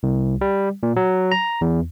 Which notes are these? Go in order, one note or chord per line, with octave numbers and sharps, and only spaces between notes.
C2
G3
A#2
F#3
A#5
E2